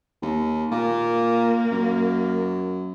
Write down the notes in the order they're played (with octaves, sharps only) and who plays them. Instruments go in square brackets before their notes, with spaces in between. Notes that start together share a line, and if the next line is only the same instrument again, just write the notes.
[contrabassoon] D#2
[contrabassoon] A#2 [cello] A#3
[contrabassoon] F#2